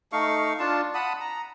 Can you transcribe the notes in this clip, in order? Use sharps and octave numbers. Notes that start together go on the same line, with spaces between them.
A3 D#4 F5 C#6
D4 F4 A5
F#5 A5 B5 D#6
A#5